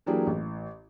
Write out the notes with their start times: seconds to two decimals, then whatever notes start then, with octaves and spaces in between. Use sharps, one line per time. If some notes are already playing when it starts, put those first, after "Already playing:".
0.06 E3 F#3 A#3 D4 G4 G#4
0.27 A1